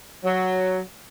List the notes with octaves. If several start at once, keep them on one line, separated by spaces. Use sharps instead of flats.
F#3